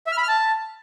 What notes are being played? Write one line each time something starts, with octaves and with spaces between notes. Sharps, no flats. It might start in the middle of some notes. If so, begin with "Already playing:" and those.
E5
F6
B5
F6
A5